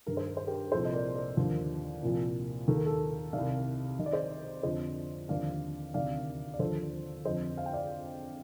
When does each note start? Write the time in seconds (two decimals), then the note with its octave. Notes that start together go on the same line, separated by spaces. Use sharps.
0.07 G2 D#3 A#4
0.17 C5
0.27 A#4
0.37 C5
0.47 G4 A#4
0.67 A#4
0.72 C2 A#2 F3 A4 C5
0.85 D#5
0.93 A#4 D5
1.15 A#4 D5
1.37 D#2 D3 F3
2.02 C2 A#2 F3
2.68 D#2 D#3 A4
2.77 A#4
2.86 A4
3.33 C2 C3 D#3 D5 F5
3.99 C2 C3 D#3 D#5
4.06 D5
4.12 C5 D#5
4.63 F2 D3 F3 C5 D#5
5.29 D#2 D3 F3 D5 F5
5.94 D2 C3 D#3 D5 F5
6.54 D5
6.59 D#2 D3 F3 A4 C5
7.25 F2 D3 F3 C5 D#5
7.58 F5
7.66 G5
7.73 D5 F5